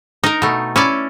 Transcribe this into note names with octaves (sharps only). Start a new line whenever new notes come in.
D#4 A#4
B2 A3
C#4 E4 D5